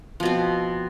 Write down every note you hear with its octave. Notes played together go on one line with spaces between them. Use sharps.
B2 F3 C4